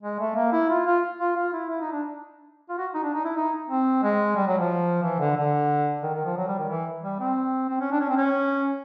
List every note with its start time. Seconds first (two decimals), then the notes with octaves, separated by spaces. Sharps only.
0.02 G#3
0.20 A3
0.36 A#3
0.52 E4
0.69 F4
0.86 F4
1.19 F4
1.36 F4
1.53 E4
1.70 E4
1.81 D#4
1.92 D4
2.69 F4
2.78 F#4
2.94 D#4
3.03 D4
3.14 D#4
3.25 E4
3.36 D#4
3.70 C4
4.03 G#3
4.36 G3
4.47 F#3
4.58 F3
5.03 E3
5.19 D3
5.36 D3
6.03 D#3
6.14 D#3
6.25 F3
6.36 F#3
6.47 G3
6.58 D#3
6.69 E3
7.02 G3
7.20 C4
7.69 C4
7.80 C#4
7.91 D4
8.00 C#4
8.09 C4
8.17 C#4